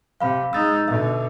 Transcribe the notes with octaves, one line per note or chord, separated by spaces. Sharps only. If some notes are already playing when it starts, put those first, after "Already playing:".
C3 F5 B5
G#3 D#4 E6 A6
B2 D3 E5